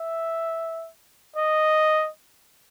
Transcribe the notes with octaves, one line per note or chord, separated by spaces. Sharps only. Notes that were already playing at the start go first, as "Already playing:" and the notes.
Already playing: E5
D#5